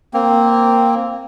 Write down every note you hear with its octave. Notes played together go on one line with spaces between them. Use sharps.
A#3 C4